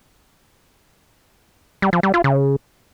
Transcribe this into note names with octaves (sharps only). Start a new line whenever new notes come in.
G3
F3
G3
F4
C#3